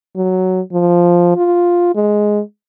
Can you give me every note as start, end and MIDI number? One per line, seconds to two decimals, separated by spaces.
0.16 0.61 54
0.72 1.34 53
1.36 1.91 65
1.95 2.40 56